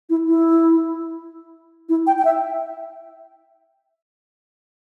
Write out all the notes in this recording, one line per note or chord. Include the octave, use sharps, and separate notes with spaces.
E4
E4
E4
G5
G5
E5